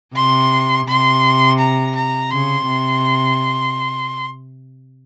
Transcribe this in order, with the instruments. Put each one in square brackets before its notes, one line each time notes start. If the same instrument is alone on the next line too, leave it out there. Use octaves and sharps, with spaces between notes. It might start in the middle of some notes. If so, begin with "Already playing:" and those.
[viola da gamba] C3 [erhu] C6
[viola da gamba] C3 [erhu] C6
[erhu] A#5
A#5
[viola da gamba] C#3 [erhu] C6
[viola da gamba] C3